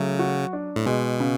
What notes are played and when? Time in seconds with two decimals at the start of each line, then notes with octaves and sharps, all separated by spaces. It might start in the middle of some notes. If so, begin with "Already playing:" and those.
Already playing: C#3 F#3 A3
0.19 F#4
0.53 D4
0.76 A2
0.86 B2 G#3
1.20 C#3